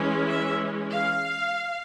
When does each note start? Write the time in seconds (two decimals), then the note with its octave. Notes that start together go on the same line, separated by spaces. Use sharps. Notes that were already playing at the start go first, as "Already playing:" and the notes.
Already playing: E3 G#3 C#4
0.29 E5
0.92 F5